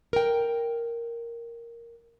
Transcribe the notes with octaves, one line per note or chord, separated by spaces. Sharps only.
A#4 G5